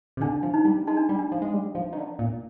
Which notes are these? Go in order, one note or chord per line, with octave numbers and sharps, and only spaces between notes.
C3
D3 D4
F3
D#4
G3
G#3 D#4
D4
G3
D4
F3
G#3
G3
F3
D#3
D3
A#2